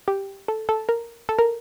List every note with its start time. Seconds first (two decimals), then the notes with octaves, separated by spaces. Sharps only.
0.08 G4
0.48 A4
0.69 A4
0.89 A#4
1.29 A4
1.39 A#4